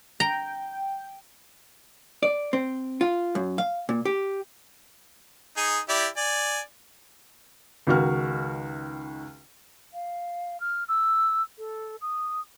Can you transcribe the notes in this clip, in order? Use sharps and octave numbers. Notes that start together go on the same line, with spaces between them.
G5 A#5
D5
C4
F4
F#2
F5
A#2
G4
D#4 G#4
E4 G4 D5
D5 G#5
C#2 D#3 F#4 F6
F5
F6
E6
A4
D#6